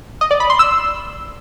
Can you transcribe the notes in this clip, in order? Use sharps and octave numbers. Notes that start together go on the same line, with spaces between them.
D#5
D5
B5
C6
E6